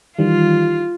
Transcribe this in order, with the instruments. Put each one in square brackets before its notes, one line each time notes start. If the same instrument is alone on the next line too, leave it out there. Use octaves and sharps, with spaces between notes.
[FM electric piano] D#3 E3 G3 [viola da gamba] F4